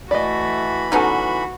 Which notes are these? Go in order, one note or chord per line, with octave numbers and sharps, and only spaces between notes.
E3 A3 F#4 D5 D#5 B5
F#3 B3 C#4 D#4 F#4 A4